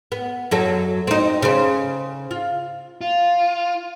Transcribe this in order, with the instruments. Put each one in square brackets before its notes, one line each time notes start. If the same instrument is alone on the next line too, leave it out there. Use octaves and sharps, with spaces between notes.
[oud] B3
F#2 F#3 A4
C4 D#4
C#3 C5
F4
[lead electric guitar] F4